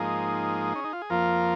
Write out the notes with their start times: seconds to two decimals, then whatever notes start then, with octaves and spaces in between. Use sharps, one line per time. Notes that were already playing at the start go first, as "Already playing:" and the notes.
Already playing: G#2 F3 A#3 D#4 G#4
0.75 C#4
0.84 D#4
0.93 F4
1.02 G#4
1.10 F2 F3 A#3 F4 A#4